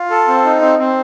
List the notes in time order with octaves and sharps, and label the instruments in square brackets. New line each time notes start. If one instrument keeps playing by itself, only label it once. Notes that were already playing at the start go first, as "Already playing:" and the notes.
Already playing: [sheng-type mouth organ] F4
A4
C4
D#4
C4
C4